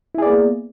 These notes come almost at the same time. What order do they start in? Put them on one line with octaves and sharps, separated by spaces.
E4 G#4 D5 B3 A#3